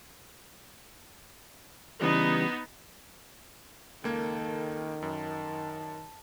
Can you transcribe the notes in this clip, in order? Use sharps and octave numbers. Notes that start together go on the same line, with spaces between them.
C#3 E3 G3 B3 D#4
C#2 D#3 A#3 A4 G#6
F#2 A5